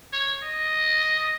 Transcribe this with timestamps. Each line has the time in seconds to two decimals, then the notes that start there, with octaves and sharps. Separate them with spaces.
0.13 C#5
0.43 D#5